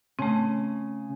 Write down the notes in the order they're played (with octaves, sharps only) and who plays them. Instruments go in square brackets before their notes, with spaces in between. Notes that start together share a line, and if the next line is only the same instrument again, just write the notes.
[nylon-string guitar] C#3 [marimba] A3 C4